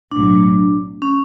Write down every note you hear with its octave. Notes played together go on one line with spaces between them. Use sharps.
B1 A2 F#3 D4
C#4